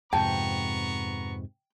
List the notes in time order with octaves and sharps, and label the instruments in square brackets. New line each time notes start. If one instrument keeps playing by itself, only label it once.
[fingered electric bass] F2 G#2 C3 [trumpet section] B3 A#5 C#6 [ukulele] G5 [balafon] A5